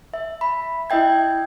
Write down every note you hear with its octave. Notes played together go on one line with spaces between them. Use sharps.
E5
B5
E4 D#5 E5 G5 G#6